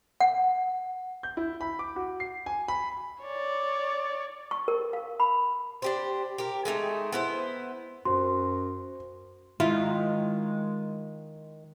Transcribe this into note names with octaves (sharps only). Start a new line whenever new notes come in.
F#5
G6
E4
B5
D6
F#4
C7
G#5
B5
C#5 D5
C#6
A#4
F5
B5
D4 G4 C5
G4 A#4
G#3 A3 B3 D#4
B3 E4 C5
F#2 F#4 C5 C6
D#3 G#3 E4 F4